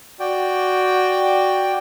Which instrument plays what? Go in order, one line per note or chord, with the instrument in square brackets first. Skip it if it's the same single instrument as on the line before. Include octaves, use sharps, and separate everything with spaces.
[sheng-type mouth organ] F#4 D5 G5